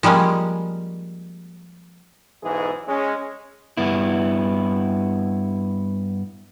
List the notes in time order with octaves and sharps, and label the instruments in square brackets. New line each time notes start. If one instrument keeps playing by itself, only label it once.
[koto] F3 G3 G#3 A#3 C#4
[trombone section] B1 G#2 E3 G#3 G#4
G#3 C#4
[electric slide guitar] G2 B3 E4